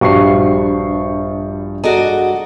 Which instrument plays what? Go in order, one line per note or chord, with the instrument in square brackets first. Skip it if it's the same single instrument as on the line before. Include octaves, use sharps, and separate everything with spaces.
[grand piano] A#1 C#6 C7 [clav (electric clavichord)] G2 [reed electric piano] F#4 G4 C5
[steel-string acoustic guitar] F#4 D5 D#5 [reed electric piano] G#4 A4 A#5